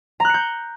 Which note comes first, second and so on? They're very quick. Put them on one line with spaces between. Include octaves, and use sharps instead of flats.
A#5 F#6 C#7 G6